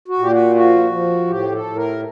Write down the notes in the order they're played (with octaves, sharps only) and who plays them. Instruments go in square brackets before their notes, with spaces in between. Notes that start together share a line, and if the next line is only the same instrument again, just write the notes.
[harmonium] F#4
A#2 G4
F#4
F3 F#4
F3
A2 G4
A4
A2
A#4